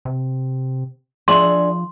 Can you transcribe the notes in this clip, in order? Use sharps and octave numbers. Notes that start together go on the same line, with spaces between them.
C3
F3 D4 G#4 E5 C6